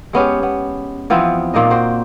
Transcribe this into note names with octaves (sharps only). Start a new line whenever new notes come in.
G#3 B3 C#4 G4
B3
E3 F3 B3 C4
A#2 A#3 D#4 D#5
F#4 C5 G5